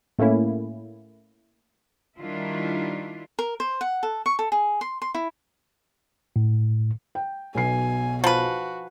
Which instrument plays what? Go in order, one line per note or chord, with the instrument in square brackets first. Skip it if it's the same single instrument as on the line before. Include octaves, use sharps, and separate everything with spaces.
[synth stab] A2 A3 A#3 C#4 E4
[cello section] D#3 G3 D4 E4 F4
[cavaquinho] A#4
C5
F#5
A4
C#6
A4
G#4
C6
C6
E4
[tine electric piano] A2
[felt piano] G5
[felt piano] B1 B2 C7 [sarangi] G#5
[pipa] F3 B4 [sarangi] F#4